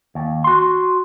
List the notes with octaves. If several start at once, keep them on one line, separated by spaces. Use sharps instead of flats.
D#2
F#4 C6